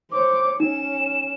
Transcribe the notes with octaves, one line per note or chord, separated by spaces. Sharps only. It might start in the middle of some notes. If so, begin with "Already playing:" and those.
C5 C#5 D6
C#4 D#4 E7